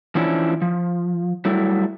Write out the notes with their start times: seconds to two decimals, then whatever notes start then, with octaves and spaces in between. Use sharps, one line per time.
0.15 E3 F3 C#4 D4 E4
0.62 F3
1.45 F#3 G3 A3 E4